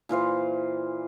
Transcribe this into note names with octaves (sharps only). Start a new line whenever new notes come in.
A#2 E3 F4 C5